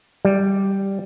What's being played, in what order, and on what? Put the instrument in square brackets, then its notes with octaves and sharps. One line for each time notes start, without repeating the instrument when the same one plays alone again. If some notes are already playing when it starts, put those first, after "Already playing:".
[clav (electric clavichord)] G3